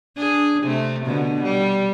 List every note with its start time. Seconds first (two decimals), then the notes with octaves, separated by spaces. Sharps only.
0.17 D4 G#4
0.63 C3 A3
1.05 B2 D3
1.44 G3